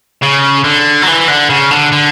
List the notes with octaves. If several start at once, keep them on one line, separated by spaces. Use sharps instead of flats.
C#3
D3
F#3
E3
D3
C#3
D3
D3